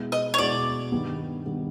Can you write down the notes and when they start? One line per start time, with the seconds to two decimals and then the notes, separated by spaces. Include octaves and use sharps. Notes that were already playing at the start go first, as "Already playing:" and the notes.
Already playing: B2 G#3 B3 E4
0.12 D#5
0.34 C#5
0.38 B2 G#3 B3 E4 D5
0.92 G2 D#3 G3 B3
1.45 D#3 G3 B3